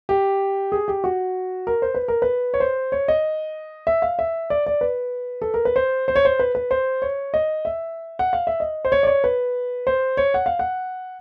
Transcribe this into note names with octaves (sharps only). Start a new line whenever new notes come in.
G4
G#4
G4
F#4
A#4
C5
B4
A#4
B4
C#5
C5
C#5
D#5
E5
F5
E5
D5
D5
B4
A4
A#4
B4
C5
C5
C#5
C5
B4
B4
C5
C#5
D#5
E5
F#5
F5
E5
D#5
C5
C#5
D5
C#5
B4
C5
C#5
F#5
F5
F#5